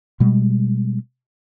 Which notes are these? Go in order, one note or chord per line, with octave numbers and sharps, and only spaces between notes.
B2 G3 G#3